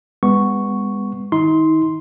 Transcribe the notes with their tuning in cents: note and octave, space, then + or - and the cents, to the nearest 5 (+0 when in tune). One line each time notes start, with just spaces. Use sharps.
G#3 -45 B3 +0 C#6 +0
D#3 +0 D#4 +40 C6 +0